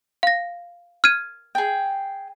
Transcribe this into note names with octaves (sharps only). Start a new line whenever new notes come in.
F5 A#6
F6 G#6 D#7
G#4 G5